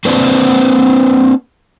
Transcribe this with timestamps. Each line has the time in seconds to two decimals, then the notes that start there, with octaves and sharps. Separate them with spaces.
0.05 A#3 C4 D4 B4 C5 D5